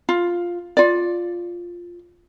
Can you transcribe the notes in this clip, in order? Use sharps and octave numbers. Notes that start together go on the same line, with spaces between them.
F4
F4 D5